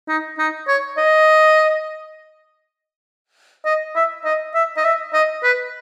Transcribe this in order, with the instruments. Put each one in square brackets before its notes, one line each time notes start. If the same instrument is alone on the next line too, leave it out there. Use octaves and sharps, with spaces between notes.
[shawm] D#4
D#4
C#5
D#5
D#5
E5
D#5
E5
D#5
E5
D#5
B4